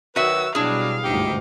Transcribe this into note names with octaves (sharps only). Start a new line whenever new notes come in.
D#3 F#3 F#4 B4 E5 E6
B2 F#3 G3 D4 E4 G#4 F5
G1 D2 G#2 D#4 G4